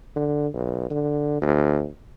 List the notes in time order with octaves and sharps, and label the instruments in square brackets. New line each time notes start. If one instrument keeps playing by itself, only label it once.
[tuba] D3
B1
D3
D2